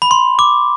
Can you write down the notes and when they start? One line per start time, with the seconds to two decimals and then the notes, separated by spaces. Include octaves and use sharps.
0.02 B5
0.11 C6
0.39 D6